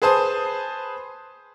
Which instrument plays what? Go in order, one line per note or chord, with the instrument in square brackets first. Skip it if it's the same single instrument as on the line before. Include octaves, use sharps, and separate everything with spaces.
[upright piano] G#4 B4 C5 A5 D#6